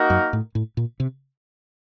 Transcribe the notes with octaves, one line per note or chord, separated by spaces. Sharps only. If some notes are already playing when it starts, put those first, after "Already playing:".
Already playing: A#3 D#4 F#4 A#4
F#2
A2
A2
A#2
C3